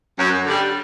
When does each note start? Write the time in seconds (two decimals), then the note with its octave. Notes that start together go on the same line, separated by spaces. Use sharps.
0.18 F#2
0.45 D3 G3